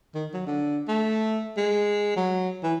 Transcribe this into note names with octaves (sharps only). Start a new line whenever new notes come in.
D#3
F#3
D3
A3
G#3
F#3
E3